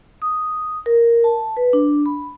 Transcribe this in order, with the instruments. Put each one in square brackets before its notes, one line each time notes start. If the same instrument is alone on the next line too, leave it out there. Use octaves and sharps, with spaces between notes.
[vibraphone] D#6
A#4
A5
B4
D4
B5